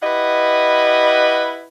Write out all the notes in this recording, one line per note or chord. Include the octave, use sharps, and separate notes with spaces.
E4 G4 B4 D#5 F#5